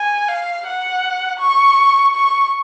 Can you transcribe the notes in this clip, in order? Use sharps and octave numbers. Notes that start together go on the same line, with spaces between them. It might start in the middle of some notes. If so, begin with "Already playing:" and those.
Already playing: G#5
F5
F#5
C#6
C#6